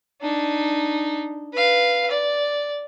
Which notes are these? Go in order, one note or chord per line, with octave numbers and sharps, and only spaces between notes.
D4 D#4
B4 F5
D5